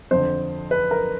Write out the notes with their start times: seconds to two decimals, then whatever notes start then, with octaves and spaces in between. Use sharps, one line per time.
0.11 F2 D3 C5
0.71 B4
0.91 A#4